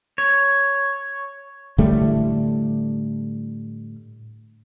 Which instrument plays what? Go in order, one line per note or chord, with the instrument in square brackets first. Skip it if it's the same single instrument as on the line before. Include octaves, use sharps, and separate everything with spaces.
[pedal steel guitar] C#5
[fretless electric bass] A2 D3 G3 A3